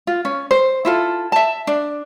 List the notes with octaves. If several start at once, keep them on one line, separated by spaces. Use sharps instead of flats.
F4
C#4
C5
E4 F4 A4
E5 A5
D4